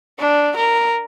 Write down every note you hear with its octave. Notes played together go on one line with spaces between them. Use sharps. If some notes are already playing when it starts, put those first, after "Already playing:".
D4
A#4